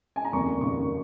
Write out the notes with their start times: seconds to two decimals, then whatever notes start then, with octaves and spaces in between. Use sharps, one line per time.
0.16 G#5
0.25 A#5
0.33 F1 D#2 C#3 C#6
0.61 F1 D#2 C#3 C#6